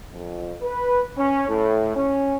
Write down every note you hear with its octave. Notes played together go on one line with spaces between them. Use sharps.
F2
B4
C#4
A2
C#4